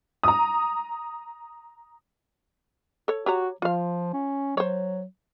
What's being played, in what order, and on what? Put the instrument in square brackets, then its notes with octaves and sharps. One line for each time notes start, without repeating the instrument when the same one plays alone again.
[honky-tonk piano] A#5 D#6
[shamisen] A4 C#5
[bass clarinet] F#4 [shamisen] G4 C#5 A#5
[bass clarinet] F3 [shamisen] F4 F5
[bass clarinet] C#4
[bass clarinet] F#3 [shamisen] C5 C#5